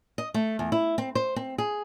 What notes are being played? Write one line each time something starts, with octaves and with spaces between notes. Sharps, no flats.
D#5
A3
E2
E4
C4
C5
C4
G#4